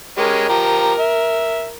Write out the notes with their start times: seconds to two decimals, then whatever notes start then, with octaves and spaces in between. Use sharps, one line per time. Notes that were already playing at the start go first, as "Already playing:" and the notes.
0.18 G#3 C#4 G4 A#4
0.49 F3 G4 A#5
0.99 E5